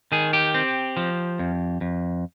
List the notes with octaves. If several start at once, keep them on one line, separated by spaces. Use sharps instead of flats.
D#3 G#4
G4
C4
F3
F2
F2